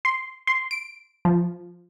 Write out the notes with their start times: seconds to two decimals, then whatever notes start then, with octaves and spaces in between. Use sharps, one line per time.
0.05 C6
0.47 C6
0.71 D7
1.25 F3